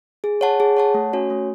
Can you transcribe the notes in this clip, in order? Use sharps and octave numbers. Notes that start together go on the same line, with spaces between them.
G#4
C#5 F#5 A5
G#4
C#5 F#5 A5
A3
C#4 F#4 C#5 G#5
A3